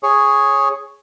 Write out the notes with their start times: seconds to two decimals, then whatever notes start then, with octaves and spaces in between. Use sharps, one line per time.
0.03 G#4 C#5